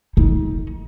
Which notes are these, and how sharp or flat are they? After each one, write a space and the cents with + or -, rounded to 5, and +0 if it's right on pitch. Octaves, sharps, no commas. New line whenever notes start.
D#4 +25